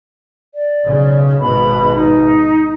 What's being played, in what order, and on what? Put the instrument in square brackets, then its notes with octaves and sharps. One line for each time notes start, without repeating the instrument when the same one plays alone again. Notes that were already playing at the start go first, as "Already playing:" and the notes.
[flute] D5
[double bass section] B1 C#3
[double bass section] G#1 G#2 B2 [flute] B5
[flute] D#4